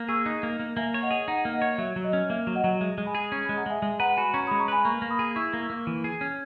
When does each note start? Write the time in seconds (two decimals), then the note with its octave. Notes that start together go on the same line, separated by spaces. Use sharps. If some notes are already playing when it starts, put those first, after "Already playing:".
Already playing: A#3
0.09 G#4 C#6 E6
0.25 D#4 D#6 F#6
0.43 A#3
0.60 A#3
0.77 A#3 E5 G#5
0.94 C#5
1.02 D#5 F#5
1.11 G#4
1.28 D#4 F#5 A#5
1.45 A#3
1.53 D#5 F#5
1.62 C#5
1.78 F#3 E5
1.96 F#3
2.04 D#5
2.13 C#4
2.30 A#3 E5
2.47 F#3
2.55 D#5 F#5
2.64 F#3
2.81 G#3 E5
2.98 G#3
3.06 G#5 B5
3.15 G#4
3.32 C#4 A#5 C#6
3.45 G#5 B5
3.49 G#3
3.57 F#5 A#5
3.66 G#3 E5 G#5
3.82 G#3 E5 G#5
4.00 B4 F#5 A#5
4.17 F#4 G#5 B5
4.34 C#4 A#5 C#6
4.47 B5 D#6
4.51 G#3
4.59 A#5 C#6
4.68 B4 G#5 B5
4.85 A#3 A#5 C#6
5.02 A#3
5.10 B5 D#6
5.19 G#4
5.36 E4 C#6 E6
5.54 A#3
5.62 C#6 E6
5.70 A#3
5.87 E3
6.04 G#4
6.21 C#4